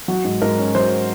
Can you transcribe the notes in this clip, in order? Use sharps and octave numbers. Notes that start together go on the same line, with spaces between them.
F#3 F#4
G#2
G#2 A#4
C#4
F#3 C5